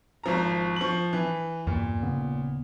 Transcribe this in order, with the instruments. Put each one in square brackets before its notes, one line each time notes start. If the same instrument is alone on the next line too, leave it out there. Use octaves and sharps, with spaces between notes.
[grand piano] G#1 F3 A#5
F3 C#6 F#7
E3
[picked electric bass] E2 G2 [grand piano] A#2
[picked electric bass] D#1 C#3 B3